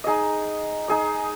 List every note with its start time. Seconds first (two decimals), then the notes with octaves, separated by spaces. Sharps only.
0.04 D#4 G#4 D#5
0.88 D#4 G#4 D#5